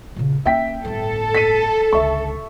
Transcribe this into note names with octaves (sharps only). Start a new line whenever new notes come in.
A#2 C#3
A#3 C#4 E5 G5 B6
G1 A2 A4
B6 D#7
C#2 D3 E5 C#6